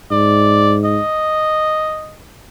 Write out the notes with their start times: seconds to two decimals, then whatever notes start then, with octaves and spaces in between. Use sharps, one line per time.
0.11 G#2 D5
0.85 D#5